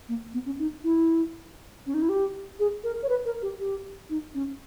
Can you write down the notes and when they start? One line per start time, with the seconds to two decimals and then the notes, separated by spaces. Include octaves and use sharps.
0.09 A#3
0.34 B3
0.46 C#4
0.59 D#4
0.84 E4
1.86 C#4
1.94 D#4
2.02 E4
2.09 G4
2.59 G#4
2.84 A#4
3.03 C#5
3.09 B4
3.25 A#4
3.42 G4
3.59 G4
4.10 D#4
4.34 C#4